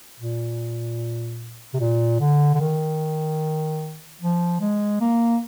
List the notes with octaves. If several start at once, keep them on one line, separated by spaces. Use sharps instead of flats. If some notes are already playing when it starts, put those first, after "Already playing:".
A#2
C3
A#2
D3
D3
D#3
F3
G#3
A#3